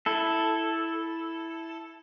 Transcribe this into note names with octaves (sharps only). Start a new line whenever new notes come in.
E4 A4